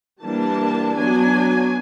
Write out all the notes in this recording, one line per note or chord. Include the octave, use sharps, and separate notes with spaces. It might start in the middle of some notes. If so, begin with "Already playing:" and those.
E3 G3 A#3 D4 A5
F#3 B3 D4 G#5